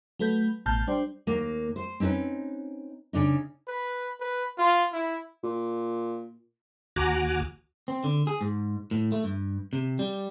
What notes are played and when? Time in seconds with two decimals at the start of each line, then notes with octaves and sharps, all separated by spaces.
0.19 F#3 A3 B4 G6
0.66 A1 B2 A5 F6 G6
0.87 G3 D4 C5 G5
1.27 D#2 A#3
1.76 C5
2.00 C4 C#4 D#4 B4
3.13 C#3 D4 D#4
3.68 B4
4.20 B4
4.59 F4
4.93 E4
5.43 A#2
6.96 D#2 F#4 G#5 A#5 D6 F#6
7.88 C4
8.04 D3
8.27 G#4
8.41 G#2
8.91 A2
9.12 A3
9.24 G2
9.73 C3
9.99 G3